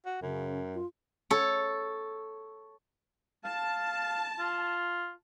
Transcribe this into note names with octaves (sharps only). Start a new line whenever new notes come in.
F#4
F#2 C#3
F4
A4 C#5
F5 A5
F4